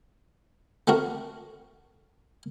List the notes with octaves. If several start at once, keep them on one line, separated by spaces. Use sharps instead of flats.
A3 C4 F#4 A#4